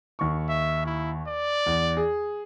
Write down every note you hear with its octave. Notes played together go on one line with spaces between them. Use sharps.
D#2 C#6
E5
E4
D5
E2
G#4